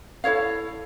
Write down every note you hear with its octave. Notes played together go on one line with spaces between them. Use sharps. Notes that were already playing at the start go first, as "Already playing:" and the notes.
E4 A4 C#5 F5